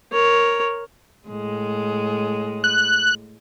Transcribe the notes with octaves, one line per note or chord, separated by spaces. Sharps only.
A#4 C#5
A2 G#3
F#6